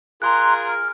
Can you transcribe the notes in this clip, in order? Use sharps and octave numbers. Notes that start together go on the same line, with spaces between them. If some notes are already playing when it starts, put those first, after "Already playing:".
F4 G#4 A#4 A#5 C6 F#6
F6